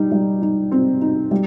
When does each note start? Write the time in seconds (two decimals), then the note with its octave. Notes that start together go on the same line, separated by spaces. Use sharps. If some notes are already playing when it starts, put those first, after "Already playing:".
Already playing: G3 D#4
0.12 G3
0.42 D#4
0.71 C4
1.01 D#4
1.31 G3